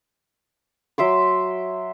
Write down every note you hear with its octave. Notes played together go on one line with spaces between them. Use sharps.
F#3 E5 C6 D6